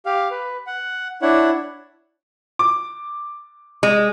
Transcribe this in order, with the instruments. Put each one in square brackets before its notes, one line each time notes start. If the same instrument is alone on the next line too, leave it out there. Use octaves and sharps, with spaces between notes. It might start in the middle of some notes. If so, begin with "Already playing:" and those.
[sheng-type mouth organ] G4 F5
B4
F#5
D4 E4 C#5 F#5
[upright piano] D6
[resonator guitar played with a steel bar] G#3